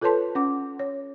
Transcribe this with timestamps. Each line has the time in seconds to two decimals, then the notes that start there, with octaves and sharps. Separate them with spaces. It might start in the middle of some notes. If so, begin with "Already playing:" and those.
0.01 F4 A4 B4 C#5 A5 C6
0.35 C#4 F#5 D6
0.79 C#5